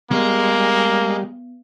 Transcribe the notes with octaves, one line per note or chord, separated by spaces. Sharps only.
G3 G#3 A#3 B3